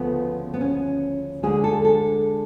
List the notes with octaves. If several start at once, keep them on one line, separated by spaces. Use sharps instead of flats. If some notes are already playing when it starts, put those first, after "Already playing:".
Already playing: D2 C#3 F3 A3 B3
B3
C#4
D2 D3 G#3 G#4
A4
A4